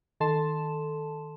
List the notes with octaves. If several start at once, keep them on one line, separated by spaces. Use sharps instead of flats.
D#3 A4 A5 C6 E7